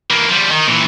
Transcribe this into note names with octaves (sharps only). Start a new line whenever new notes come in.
E3 A#3
F3 G3
D#3
A#2 E3